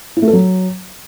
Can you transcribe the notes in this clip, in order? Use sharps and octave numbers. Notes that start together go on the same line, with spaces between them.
E4
A3
A4
F#3